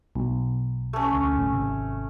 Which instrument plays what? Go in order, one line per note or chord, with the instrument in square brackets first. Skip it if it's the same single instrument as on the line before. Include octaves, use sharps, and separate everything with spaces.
[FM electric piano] B1
[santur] A3 C#4
[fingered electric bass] D2
F#1 A2
G#1 C3